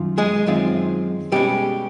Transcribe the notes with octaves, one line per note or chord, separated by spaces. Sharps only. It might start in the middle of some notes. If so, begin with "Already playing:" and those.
Already playing: F#2 D#3 F4
G#3 G#4
F#2 D#3 G#3 C4 F4
B2 G3 G#3 C#4 G4